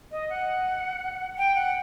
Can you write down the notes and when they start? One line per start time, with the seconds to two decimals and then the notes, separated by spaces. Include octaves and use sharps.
0.12 D#5
0.30 F#5
1.38 G5
1.55 F#5